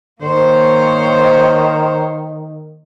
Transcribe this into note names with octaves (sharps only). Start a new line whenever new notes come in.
D#3 A#3 C5 C#5